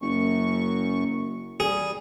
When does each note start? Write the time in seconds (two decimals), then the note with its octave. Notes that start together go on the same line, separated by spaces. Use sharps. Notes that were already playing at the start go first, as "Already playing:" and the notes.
0.02 F#1 F#2 C#6
1.60 G3 G#4